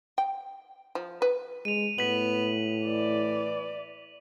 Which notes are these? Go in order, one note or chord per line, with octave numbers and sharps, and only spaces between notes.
G5
F3
B4
G#3 D#7 F7
A2 B3 B6 F#7
E3 D5